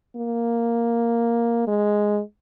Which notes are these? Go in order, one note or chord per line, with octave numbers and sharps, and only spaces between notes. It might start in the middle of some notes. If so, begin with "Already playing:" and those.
A#3
G#3